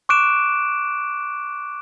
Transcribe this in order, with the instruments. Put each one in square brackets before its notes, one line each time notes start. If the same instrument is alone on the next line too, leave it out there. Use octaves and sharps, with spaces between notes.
[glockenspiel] C#6 D6 F#6 D7 E7